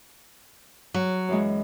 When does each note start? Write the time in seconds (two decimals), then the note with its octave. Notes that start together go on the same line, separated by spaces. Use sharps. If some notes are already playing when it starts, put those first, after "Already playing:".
0.94 F#3
1.29 F#2 E3 G#3